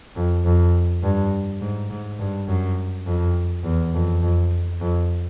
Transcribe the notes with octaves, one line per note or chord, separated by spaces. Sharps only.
F2
F2
G2
G#2
G#2
G2
F#2
F2
E2
F2
F2
F2